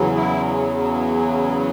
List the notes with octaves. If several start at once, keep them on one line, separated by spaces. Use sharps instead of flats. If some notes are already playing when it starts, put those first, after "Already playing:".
Already playing: E2 C#3 F#3
E4